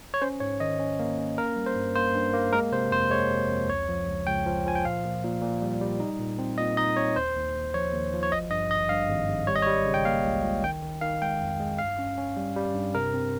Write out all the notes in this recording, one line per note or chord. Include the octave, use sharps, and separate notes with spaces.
C#5
C#4 C5
G#2 C#5
D#3 D#5
C#4
A#3
C#4
A#3 A#4
G3
C5
G2
A#3 C5
G2
A#3
G#3 A#4
C3 C5
F2 C5
G#3 C#5
C3
F2
C#2 C#5
F3
C#2
C#2 G5
F3
F3 G#5
G5
A#2 F5
A#2
A#2
A#2
G3
G3
D#4
A#2
C4
A#2 D#5
D#4 D#5
C4 C#5
D#2 C5
D#2
D#2
F3 C#5
D#2
F3
C#5
G#1 D#5
G2 D#5
G#1 D#5
G2 F5
G#1
G#1
G3 C#5
D#5
G3 C#5
C#3
G5
A#3 F5
C#2
C#2
D#3 G5
D#3
D#3 F5
G#3 G5
F2
G#3
G2 F5
C#4
C#4
G3
G3
G2
C3 A#4
C4